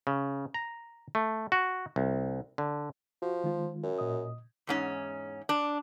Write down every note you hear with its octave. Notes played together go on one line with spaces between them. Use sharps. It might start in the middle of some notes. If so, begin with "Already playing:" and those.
C#3
A#5
A3
F#4
C2
D3
F3 F#4
D#3 G#3 F4
F#2
A#2 D#5 D#6
E2 G#2 C#4
D4